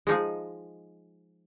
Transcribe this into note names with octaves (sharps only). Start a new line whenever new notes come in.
F3 G#3 D#4 G#4